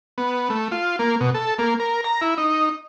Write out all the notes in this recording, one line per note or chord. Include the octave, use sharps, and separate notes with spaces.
B3
A3
F4
A#3
B2
A4
A#3
A#4
A#5
E4
D#4